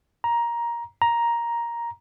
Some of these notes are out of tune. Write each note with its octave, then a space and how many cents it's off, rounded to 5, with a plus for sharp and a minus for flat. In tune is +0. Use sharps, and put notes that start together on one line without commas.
A#5 +15
A#5 +10